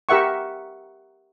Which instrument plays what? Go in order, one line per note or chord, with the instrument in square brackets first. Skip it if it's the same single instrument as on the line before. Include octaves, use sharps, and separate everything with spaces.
[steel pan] G4 A#4 E5 F#5 C#6